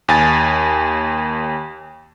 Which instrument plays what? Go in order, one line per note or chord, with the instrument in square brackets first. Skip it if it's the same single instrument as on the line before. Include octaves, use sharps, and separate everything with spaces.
[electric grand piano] D#2 G#5 A6